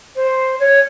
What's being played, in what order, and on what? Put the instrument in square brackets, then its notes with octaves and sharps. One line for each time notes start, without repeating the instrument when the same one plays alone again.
[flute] C5
C#5